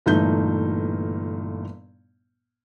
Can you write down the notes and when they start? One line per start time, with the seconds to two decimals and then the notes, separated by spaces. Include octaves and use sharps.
0.06 G1 A#2 E3 A3 D#4 G6